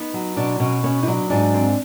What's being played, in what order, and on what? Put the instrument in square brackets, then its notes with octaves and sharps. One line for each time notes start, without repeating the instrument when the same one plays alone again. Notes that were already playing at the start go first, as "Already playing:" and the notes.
Already playing: [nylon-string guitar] B3 D#4
F#3
B2 D4
B2 C#4
B3 C#4
D#4
F#3 D4
G#2 D4
C4